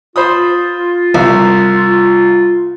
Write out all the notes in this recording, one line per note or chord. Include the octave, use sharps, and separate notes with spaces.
F4 C5 B5 D#6
C2